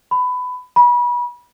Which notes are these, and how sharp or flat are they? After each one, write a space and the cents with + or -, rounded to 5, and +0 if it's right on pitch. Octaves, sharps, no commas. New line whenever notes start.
B5 +20
B5 -30